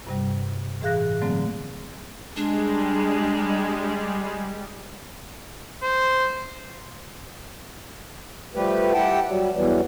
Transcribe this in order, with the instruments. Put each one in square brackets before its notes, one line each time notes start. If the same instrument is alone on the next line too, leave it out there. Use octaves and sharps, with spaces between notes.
[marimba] G2 C3 G3
A2 E3 G#4 F5 F#6 A#6
D3 F#3 A3 A#3 C4
[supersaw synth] G3 [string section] G#3 [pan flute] D4
[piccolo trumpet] C5
[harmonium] F3 G3 A3 G4 B4
E4 G4 F#5 G5 A5
F#3 G3
E2 E3 F#3 G3